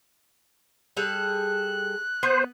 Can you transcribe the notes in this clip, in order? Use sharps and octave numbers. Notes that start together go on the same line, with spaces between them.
G3 G#4 A4 F#6
B3 C5